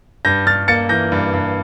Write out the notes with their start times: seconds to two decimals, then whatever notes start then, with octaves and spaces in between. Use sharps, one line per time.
0.25 G2 G6 A#6
0.46 G2 F6 A6
0.68 A#3 A6 C#7
0.89 E3 G6 A#6
1.12 G2
1.33 G2